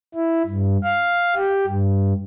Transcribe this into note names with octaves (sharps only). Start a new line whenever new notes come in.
E4
G2
F5
G4
G2